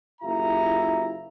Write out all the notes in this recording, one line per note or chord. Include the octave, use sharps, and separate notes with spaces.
F#1 E4 F4 G4 A#5